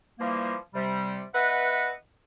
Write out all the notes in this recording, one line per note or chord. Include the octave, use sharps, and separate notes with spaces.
E3 F3 G3 A#3
C3 G3
B3 B4 D#5 E5 F#5